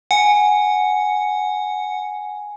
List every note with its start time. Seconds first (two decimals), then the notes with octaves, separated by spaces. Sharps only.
0.11 F#5 G#5